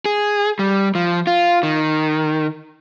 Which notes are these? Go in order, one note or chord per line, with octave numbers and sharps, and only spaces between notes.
G#4
G3
F3
F4
D#3